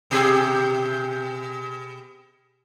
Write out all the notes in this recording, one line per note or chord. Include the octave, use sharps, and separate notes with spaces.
B2 G4 G#4